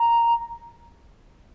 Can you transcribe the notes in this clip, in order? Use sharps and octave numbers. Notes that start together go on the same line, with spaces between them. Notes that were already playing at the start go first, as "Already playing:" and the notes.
Already playing: A#5